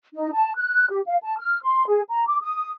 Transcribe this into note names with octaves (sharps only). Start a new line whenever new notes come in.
D#4
A5
F#6
G4
F5
A5
F6
C6
G#4
A#5
D6
D#6